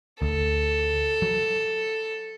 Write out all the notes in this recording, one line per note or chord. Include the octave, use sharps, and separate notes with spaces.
D2 A4
F#3